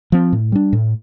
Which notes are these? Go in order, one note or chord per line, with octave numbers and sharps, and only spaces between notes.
F3 C4
A2
G3 D4
A2